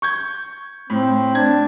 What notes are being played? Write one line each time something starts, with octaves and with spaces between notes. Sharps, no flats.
C#6 G6 G#6
A2 C4
D4 G#6